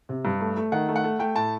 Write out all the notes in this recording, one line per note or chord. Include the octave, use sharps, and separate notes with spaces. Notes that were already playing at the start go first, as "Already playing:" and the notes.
C3
G2
A3
A3
D#3 F#5
A3
F#5
A3
A3 G5
A2 A5